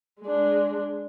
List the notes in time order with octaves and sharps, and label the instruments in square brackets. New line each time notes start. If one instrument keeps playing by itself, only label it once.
[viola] G#3 D4